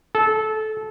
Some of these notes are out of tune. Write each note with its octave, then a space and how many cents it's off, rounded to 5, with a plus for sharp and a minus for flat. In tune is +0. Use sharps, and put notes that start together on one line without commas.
A4 -20